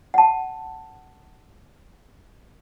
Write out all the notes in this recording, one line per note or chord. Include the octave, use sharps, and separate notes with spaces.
F#5 A5